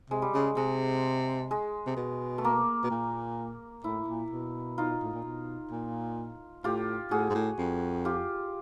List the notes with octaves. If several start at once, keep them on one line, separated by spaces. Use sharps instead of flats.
C3 G#3
G3
C#3 G#3
C3 G#3
G#3
C3
B2
A3
A#3
B2
A#2
A2 E4
A#2
B2
D#4 F4
A2
A#2
B2
A#2
A2 F4 G4
A2 F#4 G#4
G#2
A2
F2
F4 G4